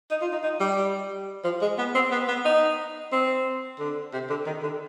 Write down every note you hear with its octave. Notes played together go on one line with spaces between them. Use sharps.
D#4
F4
D#4
D#4
G3
F3
G#3
B3
C4
B3
B3
D#4
C4
D3
C3
D3
D#3
D3